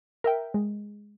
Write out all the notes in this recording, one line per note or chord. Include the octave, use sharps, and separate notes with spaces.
A#4 E5 G5
G#3